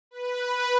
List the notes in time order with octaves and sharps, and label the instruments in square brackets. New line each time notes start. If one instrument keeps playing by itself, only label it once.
[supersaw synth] B4